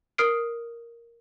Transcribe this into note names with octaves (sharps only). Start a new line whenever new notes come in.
A#4 D#6 F6 C7 D7